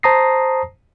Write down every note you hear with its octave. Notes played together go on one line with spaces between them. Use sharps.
C5 A5 A#5 D#6 A#6 C7